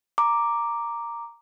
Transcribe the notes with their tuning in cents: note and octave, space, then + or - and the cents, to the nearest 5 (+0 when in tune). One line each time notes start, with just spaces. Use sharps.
A#5 +0 D6 +0